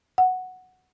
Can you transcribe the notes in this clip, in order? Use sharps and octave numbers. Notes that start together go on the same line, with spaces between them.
F#5